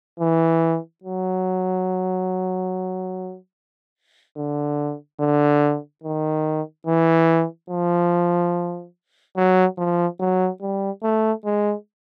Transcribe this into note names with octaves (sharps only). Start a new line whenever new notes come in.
E3
F#3
D3
D3
D#3
E3
F3
F#3
F3
F#3
G3
A3
G#3